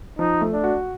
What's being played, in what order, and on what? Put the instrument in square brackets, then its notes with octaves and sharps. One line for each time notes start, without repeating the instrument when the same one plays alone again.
[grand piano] F3 [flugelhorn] D#4
[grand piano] A3
[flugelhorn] D4
[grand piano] F#4